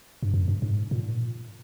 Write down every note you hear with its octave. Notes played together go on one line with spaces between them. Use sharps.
G2
F#2
G2
G#2
A#2